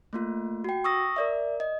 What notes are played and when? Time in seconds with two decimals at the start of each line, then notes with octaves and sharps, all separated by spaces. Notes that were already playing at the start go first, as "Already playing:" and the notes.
0.13 A3 A#3 F4
0.64 F#4 G5
0.84 C#6 D#6 E6 A#6
1.16 A#4 D5 E5
1.60 D#5